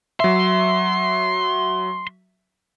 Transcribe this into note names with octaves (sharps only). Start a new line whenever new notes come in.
F#3 E5 C6